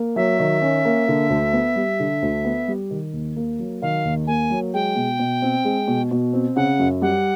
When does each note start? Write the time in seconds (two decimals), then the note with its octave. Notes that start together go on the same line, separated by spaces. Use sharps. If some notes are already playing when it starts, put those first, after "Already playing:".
Already playing: A#3
0.16 F#3 E5
0.39 D#3
0.62 C#4
0.85 A#3
1.08 D3
1.30 D2
1.53 B3
1.76 G3
2.00 D3
2.22 D2
2.45 B3
2.68 G3
2.91 D#3
3.13 D#2
3.36 A#3
3.59 F#3
3.82 D#3 F5
4.05 D#2
4.27 A#3 G#5
4.50 F#3
4.74 G#3 G5
4.96 B2
5.19 B2
5.42 C4
5.65 G#3
5.88 B2
6.11 B2
6.33 C4
6.56 C#3 F#5
6.79 F#2
7.02 G3 F#5